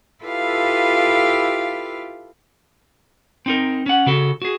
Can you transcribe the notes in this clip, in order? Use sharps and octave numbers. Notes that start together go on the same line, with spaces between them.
E4 F4 G4 A4 B4 F5
C4 D#4 A#4
C#4 F#5
C#3 F#4 A4
F#4 G#4